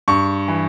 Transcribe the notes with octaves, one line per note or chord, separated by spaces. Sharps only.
G2 C#6
E3